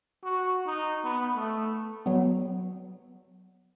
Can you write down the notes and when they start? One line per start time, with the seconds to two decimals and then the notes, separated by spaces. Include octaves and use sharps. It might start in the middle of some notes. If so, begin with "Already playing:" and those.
0.24 F#4
0.67 D#4
1.05 B3
1.36 A3
2.06 F#3 B3